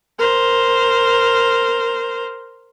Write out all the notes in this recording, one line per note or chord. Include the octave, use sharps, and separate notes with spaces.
A#4 C5